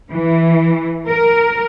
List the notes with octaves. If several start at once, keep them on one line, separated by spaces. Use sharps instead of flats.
E3
A#4